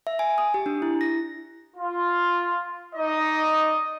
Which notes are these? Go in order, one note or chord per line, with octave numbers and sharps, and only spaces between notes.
E5
G#5
D#6
G4
D4
E4
A#6
F4
D#4 D5 D#5